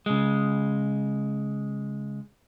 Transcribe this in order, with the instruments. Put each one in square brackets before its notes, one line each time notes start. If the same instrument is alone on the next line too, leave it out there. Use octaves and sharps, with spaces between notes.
[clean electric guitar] C#3 G#3